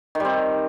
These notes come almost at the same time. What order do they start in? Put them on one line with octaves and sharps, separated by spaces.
D#3 G3 C4